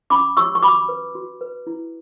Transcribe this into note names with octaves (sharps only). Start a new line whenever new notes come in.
C#4 B5 D6
G4 C#5 C#6 E6
C#6
F#4 B5 D6
B4
F#4
B4
E4